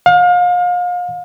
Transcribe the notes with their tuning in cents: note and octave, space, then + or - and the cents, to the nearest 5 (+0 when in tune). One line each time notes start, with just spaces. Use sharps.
F5 +35